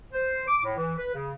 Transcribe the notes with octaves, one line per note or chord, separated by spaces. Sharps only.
C5
D6
A2
E3
B4
C#3